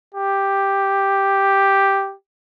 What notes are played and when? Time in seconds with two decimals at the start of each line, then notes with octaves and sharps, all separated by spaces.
0.14 G4